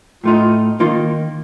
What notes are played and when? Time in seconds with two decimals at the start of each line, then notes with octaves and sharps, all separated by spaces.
0.24 A2 A3 D#4 F4
0.80 D#3 A#3 D#4 F4